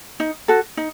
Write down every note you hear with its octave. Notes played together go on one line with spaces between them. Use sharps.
D#4
F#4 A4
D#4